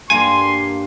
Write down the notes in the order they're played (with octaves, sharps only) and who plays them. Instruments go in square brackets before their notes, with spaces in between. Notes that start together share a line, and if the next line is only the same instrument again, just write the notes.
[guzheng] G2 A#3 [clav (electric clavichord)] G#5 [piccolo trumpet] C6